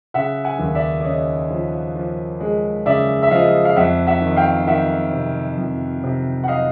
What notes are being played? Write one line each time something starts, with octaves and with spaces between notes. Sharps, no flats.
C#3 E5 F#5
F#5 G#5
D#2
D5 E5
D5
C#3 C#5 D#5
F3
F3
G#3
C#3 D5 E5
E5
F3 D#5 F5
F5
F2 E5 F#5
E5 F#5
D#3
F5 G5
D#3 E5 F#5
C3
F2
C3
F#5
D#5 F5